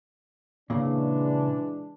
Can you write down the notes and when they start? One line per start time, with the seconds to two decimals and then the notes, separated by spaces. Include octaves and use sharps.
0.70 A#2 C#3 E3 G#3 D4